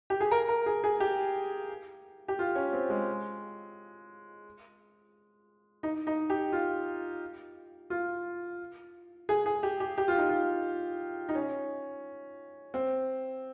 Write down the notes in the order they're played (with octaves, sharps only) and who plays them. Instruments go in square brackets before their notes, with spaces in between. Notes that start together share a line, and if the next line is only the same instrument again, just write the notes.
[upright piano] G4
G#4
A#4
A#4
G#4
G#4
G4
G4
F4
C#4
C4
G#3
D#4
D#4
G4
F4
F4
G#4
G#4
G4
G4
G4
F4
D#4
F4
D#4
C#4
C4